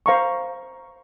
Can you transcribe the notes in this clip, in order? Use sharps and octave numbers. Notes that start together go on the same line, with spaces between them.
C5 F5 A#5 C#6